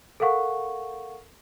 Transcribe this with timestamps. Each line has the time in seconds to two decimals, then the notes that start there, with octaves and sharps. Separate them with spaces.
0.20 A4 A#4 F5 F#5 C#6